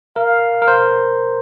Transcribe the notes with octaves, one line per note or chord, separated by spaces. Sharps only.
A#4 F5
A#4
C5